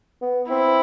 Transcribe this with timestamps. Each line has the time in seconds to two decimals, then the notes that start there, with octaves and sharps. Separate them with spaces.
0.22 B3
0.49 C4 E4